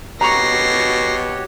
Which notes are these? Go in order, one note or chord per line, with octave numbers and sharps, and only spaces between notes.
B2 F#4 G4 C#5 A#5 C#6 A#6 C7